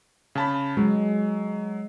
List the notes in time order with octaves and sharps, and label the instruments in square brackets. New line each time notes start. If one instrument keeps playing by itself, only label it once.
[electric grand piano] C#3 A5 B5
[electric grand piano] F#3 [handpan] G#3